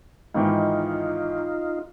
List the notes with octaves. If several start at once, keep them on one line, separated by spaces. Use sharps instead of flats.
G#2 D#3 E3 D#4 F4